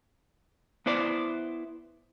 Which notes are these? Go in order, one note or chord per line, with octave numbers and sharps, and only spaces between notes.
B3 E4 C5 D5